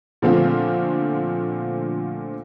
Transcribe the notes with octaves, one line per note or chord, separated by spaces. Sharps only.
A#2 D3 F3 A3 C4 F4